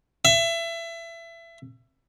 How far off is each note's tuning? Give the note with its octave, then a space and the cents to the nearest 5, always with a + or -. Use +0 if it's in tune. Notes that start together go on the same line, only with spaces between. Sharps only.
E5 +25